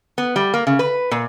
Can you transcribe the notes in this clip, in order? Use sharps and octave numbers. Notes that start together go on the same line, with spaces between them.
B3
G3
A#3
C#3
B4
A#2